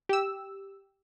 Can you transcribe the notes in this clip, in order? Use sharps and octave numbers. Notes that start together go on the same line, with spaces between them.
G4 E6